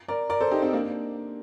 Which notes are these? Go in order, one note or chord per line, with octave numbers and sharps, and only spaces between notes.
A#4 D5
A#4 D5
A4 C5
D#4 G4
C4 D#4
A#3 D4